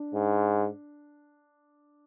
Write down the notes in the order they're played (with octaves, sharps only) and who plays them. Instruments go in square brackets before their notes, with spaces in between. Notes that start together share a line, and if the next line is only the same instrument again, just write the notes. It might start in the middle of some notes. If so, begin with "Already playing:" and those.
Already playing: [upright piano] D4
[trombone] G#2